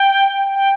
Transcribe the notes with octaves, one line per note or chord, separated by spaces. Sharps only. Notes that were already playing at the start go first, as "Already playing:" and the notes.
Already playing: G5
G5